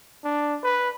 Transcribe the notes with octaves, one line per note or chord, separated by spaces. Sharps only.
D4
B4